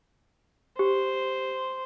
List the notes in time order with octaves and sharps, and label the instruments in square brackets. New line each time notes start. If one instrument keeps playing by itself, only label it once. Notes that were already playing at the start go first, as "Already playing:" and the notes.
[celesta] G4 [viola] C5